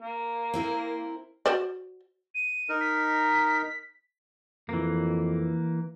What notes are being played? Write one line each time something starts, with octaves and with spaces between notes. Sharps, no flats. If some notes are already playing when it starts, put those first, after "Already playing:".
A#3
C4 E4 A#4
F#4 C5 D5
D#7
D#4 A#4
B6
F2 E3 A#3